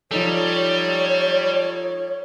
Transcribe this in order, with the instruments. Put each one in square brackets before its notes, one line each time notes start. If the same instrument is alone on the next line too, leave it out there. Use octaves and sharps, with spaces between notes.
[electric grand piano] F3 D#4 A4 [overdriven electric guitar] G3 [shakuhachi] C#5